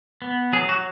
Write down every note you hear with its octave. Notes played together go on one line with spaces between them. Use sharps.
B3
F#3 G#4
F#4